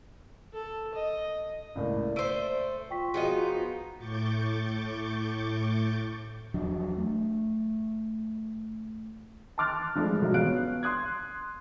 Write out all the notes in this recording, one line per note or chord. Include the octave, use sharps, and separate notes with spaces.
A4
D#5
C#2 A2 A#3 D5
A3 C5 E6 D7 D#7
F4 G5 C#6 B6
F3 B3 D#4 F#4 G#4
A2 C#6 D6 G6 A6
E2 F3 F#3 D4
A3
A5 C6 D6 F6 F#6 A6
G2 F3 G#3 A3
G#2 B2 F3 F#3
B3 C#4 F5 F#6 D7
C6 D#6 F#6 G#6